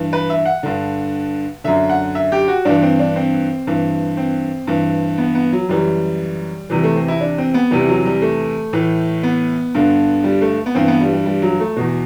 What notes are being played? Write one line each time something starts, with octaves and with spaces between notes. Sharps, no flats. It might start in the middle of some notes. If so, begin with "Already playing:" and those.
Already playing: G2 E3
B4
E5
F#5
G2 D3
F#2 D3 E5
F#5
E5
G4
F#4
G2 E3 D4
C4
D4
C4
G2 E3
C4
G2 E3
B3
B3
F#3
F#2 E3 G3
E2 C3 E3 G3
A3
C4
E4
D4
C4
B3
E2 C3 E3 G3
F#3
G3
A3
A2 E3
B3
G2 D3
G3
A3
B3
G2 E3 C4
B3
G3
G3
G3
F#3
A3
E2 B2